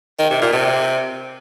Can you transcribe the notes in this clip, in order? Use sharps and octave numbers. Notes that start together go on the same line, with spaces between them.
D#3
C3
A#2
C3